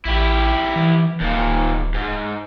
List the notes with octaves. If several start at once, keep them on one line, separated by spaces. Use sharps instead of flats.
A1 E4 G4
E3
D1 D#2 A#2
G#2